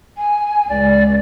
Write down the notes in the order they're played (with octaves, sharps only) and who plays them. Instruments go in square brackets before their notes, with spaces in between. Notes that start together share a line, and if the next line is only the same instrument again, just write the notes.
[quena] G#5
[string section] C#2 [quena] D5